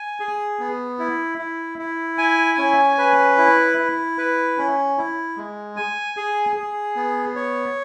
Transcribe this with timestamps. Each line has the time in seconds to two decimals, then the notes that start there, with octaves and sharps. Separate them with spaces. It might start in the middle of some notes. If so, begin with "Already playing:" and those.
Already playing: G#5
0.20 G#4
0.59 B3
0.99 E4
1.38 E4
1.79 E4
2.18 G#5
2.58 C#4
2.98 B4
3.38 E4
3.78 E4
4.18 B4
4.58 C#4
4.98 E4
5.37 G#3
5.76 G#5
6.17 G#4
6.56 G#4
6.96 B3
7.36 C#5